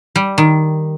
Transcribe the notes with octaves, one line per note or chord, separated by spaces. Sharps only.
G3
D#3